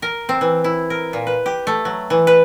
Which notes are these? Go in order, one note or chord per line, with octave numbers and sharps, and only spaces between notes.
A#4
C4
E3
E4
A#4
A#2
B4
G4
A3
F#3
E3
B4